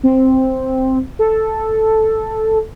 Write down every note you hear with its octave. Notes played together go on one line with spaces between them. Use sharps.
C4
A4